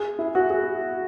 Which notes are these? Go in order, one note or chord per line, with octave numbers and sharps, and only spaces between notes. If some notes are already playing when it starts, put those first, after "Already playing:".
Already playing: G#4
E4
F#4
G#4